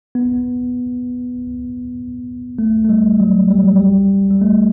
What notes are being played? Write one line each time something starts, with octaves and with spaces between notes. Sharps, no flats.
B3
A3
A3
G3
F#3
G3
F#3
G3
G3
A3